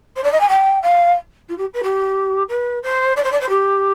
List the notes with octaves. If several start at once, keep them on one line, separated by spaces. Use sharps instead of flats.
C5
D5
D#5
G#5
G5
F5
F4
G4
B4
G4
B4
C5
D5
C5
D5
C5
G4